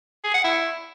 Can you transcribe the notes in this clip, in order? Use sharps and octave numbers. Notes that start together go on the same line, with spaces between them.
G#4
F#5
E4